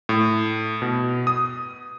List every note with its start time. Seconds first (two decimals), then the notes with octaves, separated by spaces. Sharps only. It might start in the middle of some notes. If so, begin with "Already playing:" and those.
0.09 A2
0.82 B2
1.27 D#6